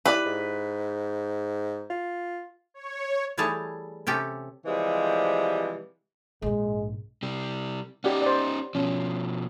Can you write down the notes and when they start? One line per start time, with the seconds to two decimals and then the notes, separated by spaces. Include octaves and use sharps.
0.05 E4 G4 B4 D5
0.26 G#2
1.90 F4
2.74 C#5
3.38 E3 G3 A3 G#4 C#5 A5
4.07 C3 C#4 G4 A4
4.65 C3 E3 F3 G3 G#3
6.42 A#1 G#2 G#3
7.23 C3 G3
8.04 C#4 D#4 G4 D5 F#5
8.22 C5 D5
8.75 B2 F3 C#4